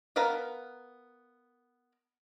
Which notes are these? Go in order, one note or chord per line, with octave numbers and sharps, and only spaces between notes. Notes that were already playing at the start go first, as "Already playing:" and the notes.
B3 A#4 B4 F5 A5